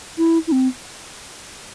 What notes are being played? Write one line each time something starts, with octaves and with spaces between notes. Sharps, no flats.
E4
E4
C4